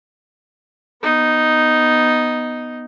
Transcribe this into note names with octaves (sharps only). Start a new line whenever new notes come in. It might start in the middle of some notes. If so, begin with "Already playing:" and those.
B3 D#4